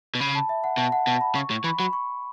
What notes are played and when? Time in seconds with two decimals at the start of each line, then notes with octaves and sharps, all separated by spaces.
0.15 B2
0.20 C#3 B5
0.35 A5
0.49 E5
0.64 F#5
0.77 B2 A5
0.92 F#5
1.07 B2 A5
1.21 B5
1.35 C#3 C#6
1.50 A2 C#6
1.64 E3 B5
1.79 F#3 B5
1.93 C#6